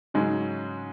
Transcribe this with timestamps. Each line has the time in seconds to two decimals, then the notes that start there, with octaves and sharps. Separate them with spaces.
0.14 G#2 C#3 F#3 G#3 C#4